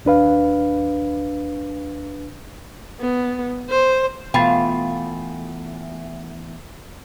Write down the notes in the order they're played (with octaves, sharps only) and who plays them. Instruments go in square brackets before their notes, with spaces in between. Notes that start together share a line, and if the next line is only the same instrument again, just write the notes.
[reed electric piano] D#2 D4 B4 F5
[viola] B3
C5
[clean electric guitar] E2 A3 [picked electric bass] B2 [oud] F4 [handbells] G5 B5 A6